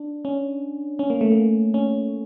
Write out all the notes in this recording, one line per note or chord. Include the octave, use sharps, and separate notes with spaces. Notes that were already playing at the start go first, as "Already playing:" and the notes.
Already playing: D4
C#4
C#4
A#3
A3
A#3
C#4